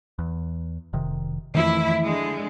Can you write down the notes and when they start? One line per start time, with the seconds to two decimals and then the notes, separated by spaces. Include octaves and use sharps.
0.19 E2
0.93 F1 C3 D#3
1.55 F2 D#3 E3 A3 E4
2.05 D3 G#3